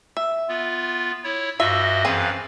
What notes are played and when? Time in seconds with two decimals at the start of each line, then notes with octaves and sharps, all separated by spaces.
0.17 E5
0.49 B3 F4
1.24 E4 C#5
1.59 G2 F4 F#4 D#5 E5
2.05 F#2 E3 C4 G#4 B4 F5